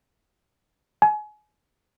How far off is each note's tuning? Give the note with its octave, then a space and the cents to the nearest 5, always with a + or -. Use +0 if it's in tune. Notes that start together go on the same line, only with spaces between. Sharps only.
G#5 +30